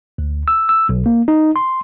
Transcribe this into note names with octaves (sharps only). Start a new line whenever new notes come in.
D2
E6
E6
B1
A#3
D#4
C6